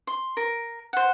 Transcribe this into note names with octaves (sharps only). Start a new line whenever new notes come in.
C6
A#4
C5 F#5